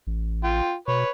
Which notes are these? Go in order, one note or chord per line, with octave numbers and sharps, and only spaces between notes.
A1
F4 G5
B2 B4 C#5